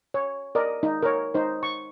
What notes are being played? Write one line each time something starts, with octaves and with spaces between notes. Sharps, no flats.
C#5
A#4 D5 D#5
D#4
A#4 C#5
D#4 C5
C#6